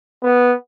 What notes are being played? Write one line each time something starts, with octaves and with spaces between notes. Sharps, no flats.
B3